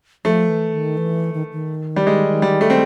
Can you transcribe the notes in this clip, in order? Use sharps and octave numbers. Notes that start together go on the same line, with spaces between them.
F3 A3
E3
D#3
E3
D#3
D#3
G3
G#3
G3
A3
C4